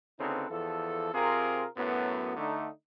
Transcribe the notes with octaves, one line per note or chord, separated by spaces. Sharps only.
D2 C#3 C4 D#4 A4 B4
E2 E3 F3 A4
C3 C4 F4 G#4 A#4
F#2 A2 F#3 B3
D3 A3 D#4